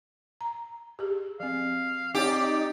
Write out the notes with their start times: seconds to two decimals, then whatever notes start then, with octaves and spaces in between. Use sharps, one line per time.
0.41 A#5
0.99 G4 G#4
1.40 F3 C4 F5
2.15 C4 D#4 G4 C#5 D5